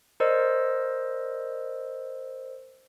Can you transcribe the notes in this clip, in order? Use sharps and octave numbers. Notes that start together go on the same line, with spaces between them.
A#4 C5 D5 D#5 E6